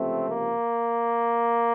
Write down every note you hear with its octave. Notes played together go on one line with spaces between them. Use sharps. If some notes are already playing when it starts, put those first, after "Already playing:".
Already playing: C#2 C3 F3 A3 C4
A#3